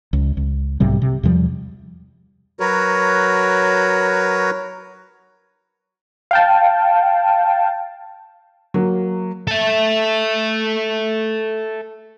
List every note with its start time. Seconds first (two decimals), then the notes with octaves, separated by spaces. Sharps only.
0.13 C#2
0.37 C#2
0.80 B1 G#2 C3 G3
1.02 C3
1.23 E2 C3 F3 G3
2.60 F#3 F#4 A#4 B4 C#5
6.31 F5 G5 A5
8.74 F#3 A#3
9.47 A4 E5